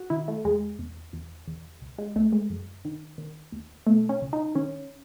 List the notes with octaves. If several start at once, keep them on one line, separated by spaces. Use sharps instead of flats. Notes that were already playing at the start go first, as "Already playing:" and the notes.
Already playing: F#4
D#3 E4
A3
E2 G#3
E2
E2
E2
C#2
G#3
C#2 A3
G#3
F#2
D#3
D#3
D#2
B2 A3
C#4
C#2
D#4
D#3 C#4